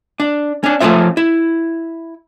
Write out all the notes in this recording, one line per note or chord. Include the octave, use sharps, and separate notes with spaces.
D4
C#4 D4
F3 A3 C#4 F4 C5 E5
E4